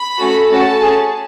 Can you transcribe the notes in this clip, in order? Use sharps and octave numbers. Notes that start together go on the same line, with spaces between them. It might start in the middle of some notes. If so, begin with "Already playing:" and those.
Already playing: B5
A3 C#4 F#4 A4
A3 C#4 F#4 A4 A5
C#4 G#4